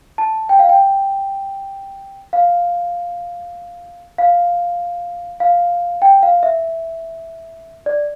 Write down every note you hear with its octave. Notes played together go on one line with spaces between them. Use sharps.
A5
G5
F5
G5
F5
F5
F5
G5
F5
E5
D5